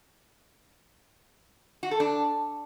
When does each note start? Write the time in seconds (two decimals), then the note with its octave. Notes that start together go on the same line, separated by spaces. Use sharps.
1.83 F#4
1.91 A4
2.00 D4